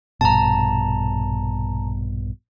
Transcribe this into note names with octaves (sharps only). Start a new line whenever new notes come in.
A#1 G2 B2 A5 A#5